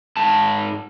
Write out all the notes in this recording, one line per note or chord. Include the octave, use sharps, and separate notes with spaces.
G#2 A5